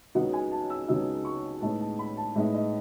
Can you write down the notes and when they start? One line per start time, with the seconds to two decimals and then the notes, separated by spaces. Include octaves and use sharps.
0.15 C#2 C#3 F#3 B3 D#4 F#5
0.33 G#5
0.52 A5
0.70 E6
0.88 C#2 C#3 F#3 B3 D#4 E6
1.25 C#6
1.61 A2 G#3 B3 D#4 A5
1.80 A5
1.99 B5
2.17 A5
2.35 A2 G#3 B3 D#4 E5
2.54 D#5